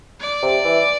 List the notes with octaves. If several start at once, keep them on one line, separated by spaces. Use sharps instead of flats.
D5
C3
E3